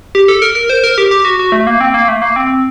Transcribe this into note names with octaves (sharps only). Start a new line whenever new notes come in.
G4
A4
A#4
A#4
C5
A#4
G4
G4
F#4
F#4
A3
A#3
C4
A#3
A3
A#3
C4